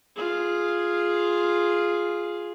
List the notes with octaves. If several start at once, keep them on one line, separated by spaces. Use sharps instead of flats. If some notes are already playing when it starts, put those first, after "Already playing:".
F4 G#4